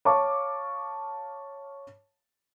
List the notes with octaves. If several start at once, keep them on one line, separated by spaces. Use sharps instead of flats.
C#5 F5 A5 C#6 D6